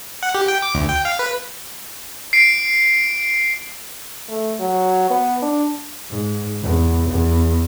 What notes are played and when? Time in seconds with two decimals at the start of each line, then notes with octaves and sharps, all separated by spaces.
0.23 F#5
0.35 G4
0.48 G5
0.62 D6
0.75 D2
0.89 G5
1.05 F5
1.19 B4
2.33 C7 D7
4.29 A3
4.60 F#3
5.10 B3
5.42 D4
6.11 G#2
6.63 E2
7.09 E2